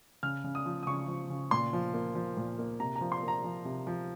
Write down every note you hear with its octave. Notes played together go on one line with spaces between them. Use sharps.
C#3 F6
C#3
D#6
F3
D#6
C#3 C#6
F3
C#3
A#2 C6
F3
A#3
F3
A#2
A#3
C3 A#5
A#5
F3
C6
A#3
A#5
F3
C3
F3